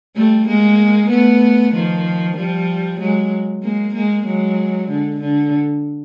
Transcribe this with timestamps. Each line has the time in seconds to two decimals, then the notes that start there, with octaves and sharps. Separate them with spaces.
0.16 G3 A3
0.47 G#3 A#3
1.10 A3 B3
1.73 D#3 F3
2.37 F3 G3
3.00 F#3 G#3
3.63 G#3 A#3
3.94 G#3 A#3
4.26 F#3 G#3
4.89 D3
5.21 D3